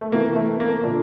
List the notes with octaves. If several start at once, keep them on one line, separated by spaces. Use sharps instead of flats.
A3
C3 E3 A#3
A3
A#3
A#2 D3 F3 D4